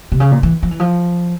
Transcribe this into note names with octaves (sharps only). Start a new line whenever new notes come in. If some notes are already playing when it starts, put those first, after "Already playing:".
C3
C#3
A#2
E3
F3
E3
F3